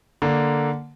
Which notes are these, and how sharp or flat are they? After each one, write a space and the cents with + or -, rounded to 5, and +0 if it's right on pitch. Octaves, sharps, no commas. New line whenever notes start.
D3 +0 A#3 +0